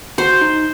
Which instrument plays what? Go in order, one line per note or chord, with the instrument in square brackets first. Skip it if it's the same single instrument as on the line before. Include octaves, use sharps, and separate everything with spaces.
[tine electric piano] F#4 [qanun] C5
[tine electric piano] D#4